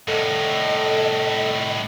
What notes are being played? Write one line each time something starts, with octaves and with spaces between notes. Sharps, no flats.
C2 A2 A4 D#5